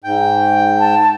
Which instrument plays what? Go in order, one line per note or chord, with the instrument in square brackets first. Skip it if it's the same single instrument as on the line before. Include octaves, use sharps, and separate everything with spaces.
[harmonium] G#2 G5
[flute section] A5